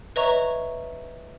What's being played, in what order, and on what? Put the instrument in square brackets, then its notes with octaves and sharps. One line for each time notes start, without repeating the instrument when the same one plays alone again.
[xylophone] B4 C#5 D#5 E5 A#5 C#6